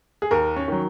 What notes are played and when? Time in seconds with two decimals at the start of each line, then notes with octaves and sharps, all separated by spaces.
0.22 G#4
0.31 D#2 A#4
0.56 C#4
0.68 D#3 F#3